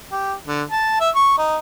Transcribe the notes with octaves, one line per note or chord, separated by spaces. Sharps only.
G4
D3
A5
E5
C#6
D#4